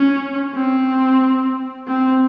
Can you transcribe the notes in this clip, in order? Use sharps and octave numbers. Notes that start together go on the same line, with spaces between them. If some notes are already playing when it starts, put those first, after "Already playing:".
Already playing: C#4
C4
C4